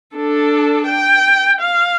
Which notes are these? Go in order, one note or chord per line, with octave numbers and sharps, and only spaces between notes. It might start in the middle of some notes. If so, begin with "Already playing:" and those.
D4 A4
G5
F5